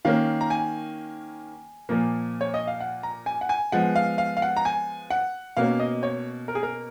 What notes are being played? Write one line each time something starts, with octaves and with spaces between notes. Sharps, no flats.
D#3 A#3 C#4 F5
A#5
G#5
A#2 F3 A#3
C#5
D#5
F5
F#5
A#5
G#5
F#5
G#5
F3 G#3 B3 F#5
F5
F5
F5
F#5
A#5
G#5
F#5
B2 A#3 C#4 F5
D#5
C#5
A#4
G#4
A#4